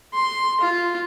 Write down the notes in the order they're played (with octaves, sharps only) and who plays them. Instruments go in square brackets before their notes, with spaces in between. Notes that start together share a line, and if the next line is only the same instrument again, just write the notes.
[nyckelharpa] C6
F4